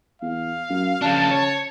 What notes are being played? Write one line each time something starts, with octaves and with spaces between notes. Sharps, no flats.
E2 F5
F#2
C#3 F3 D4 A5
C#5